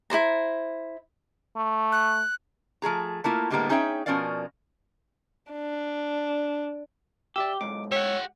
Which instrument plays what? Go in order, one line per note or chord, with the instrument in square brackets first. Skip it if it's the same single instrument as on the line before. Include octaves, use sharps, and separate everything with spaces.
[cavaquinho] E4 A4 C5 A#5
[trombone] A3
[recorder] F#6
[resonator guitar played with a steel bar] F3 A3 G#4 A#5
A3 A#3 E4 F4
A2 D3 G3 G#3 A#3 B3
C#4 D#4 G#4 C#5 E5 G5
B2 F3 C#4 A#4 D5 F5
[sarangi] D4
[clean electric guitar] G4 [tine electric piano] D5 E5 E6
[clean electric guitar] B1 G#2 [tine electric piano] D6
[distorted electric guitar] G4 F#5 [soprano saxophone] C#5 [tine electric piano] E6